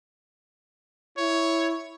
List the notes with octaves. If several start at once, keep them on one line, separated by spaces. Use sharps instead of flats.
E4 C#5